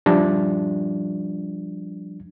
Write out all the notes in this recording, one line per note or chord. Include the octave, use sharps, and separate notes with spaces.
F3 G3 D4